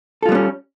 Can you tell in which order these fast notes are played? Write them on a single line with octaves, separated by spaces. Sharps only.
A4 F4 G3 B3 C#4